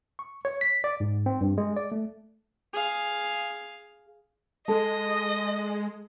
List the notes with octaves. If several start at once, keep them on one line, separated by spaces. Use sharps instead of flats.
C#6
C#5
B6
D5
G#2
C4
G2
G#3
D5
A3
G#4 F5
G#3 A4 D#5 A5